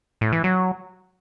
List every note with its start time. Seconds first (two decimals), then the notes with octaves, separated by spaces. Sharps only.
0.21 A2
0.33 E3
0.44 F#3